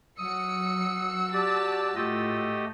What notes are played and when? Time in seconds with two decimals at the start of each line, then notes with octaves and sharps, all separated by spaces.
0.19 F#3 F#4 D#6 E6 C#7
1.33 G4 D5 A5
1.96 A2 A3 F4 G4 D#5